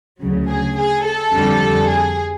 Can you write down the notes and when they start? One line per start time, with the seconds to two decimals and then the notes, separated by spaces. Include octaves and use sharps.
0.20 D2 C#3 F#3
0.49 G#4
0.77 G#4
1.04 A4
1.33 F2 D3 G3
1.89 G#4